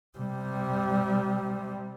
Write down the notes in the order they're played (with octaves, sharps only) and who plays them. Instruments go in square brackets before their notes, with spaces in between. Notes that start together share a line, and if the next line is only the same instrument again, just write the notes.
[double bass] C3 G3